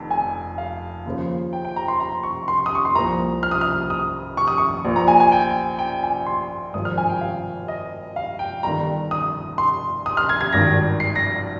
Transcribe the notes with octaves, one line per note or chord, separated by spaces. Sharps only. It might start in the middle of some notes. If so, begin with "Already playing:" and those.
Already playing: F1 F2 D#3
G#5
F5
D#2 C#3 F3
G5
G5
A#5
C6
A#5
C#6
C6
D#6
C#6
C6
C2 A#2 F3 A#5
F6
D#6
F6
D#6
C#6
D#6
C#6
A#1 A#2 F3
A#5
G#5
G#5
G5
G5
G#5
C6
G#1 G2 F3 D#6
F6
G#5
G5
F5
D#5
F5
G5
G1 G2 D#3 A#5
D#6
C6
D#6
F6
G#6
G#6
G#1 G2 D#3 A#6
C7
A#6